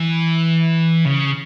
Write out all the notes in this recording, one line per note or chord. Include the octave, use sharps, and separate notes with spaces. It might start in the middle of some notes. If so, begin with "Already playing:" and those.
Already playing: E3
C#3